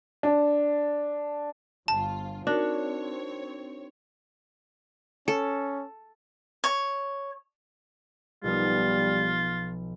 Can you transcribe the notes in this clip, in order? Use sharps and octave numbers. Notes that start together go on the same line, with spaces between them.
D4
G1 F4 A5
C4 D4 D#4 F#4 A#4 C#5
C#4 A4
C#5
B1 F3 G3 B3 F4